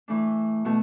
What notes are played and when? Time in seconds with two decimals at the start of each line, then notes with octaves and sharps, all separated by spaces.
0.08 E3 A3 D4
0.65 B2 A3 F#4